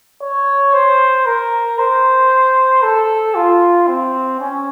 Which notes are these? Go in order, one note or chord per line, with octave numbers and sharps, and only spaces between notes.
C#5
C5
A#4
C5
A4
F4
C4
C#4